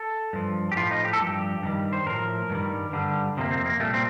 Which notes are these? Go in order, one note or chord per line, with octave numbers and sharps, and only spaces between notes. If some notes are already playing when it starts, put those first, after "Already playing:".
Already playing: A4
G2 F3
G4
A2 F3 F4
D#4
G4
A4
G2 F3 G4
G2 D#3 G3
C5
A2 F3 A#4
G2 D#3 G3
G2 D3 G3
F2 C3 F3 A#3
C4
A#3
A#2 G3 A3
C4